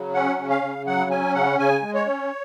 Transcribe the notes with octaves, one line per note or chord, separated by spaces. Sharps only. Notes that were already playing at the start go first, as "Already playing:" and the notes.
Already playing: C#3 F#3
C#4 F#5
C#3
F5
C#3
F#3 F#5
C#4 G#5
C#3 F#5
C#3 G#5
G#3
C#5
C#4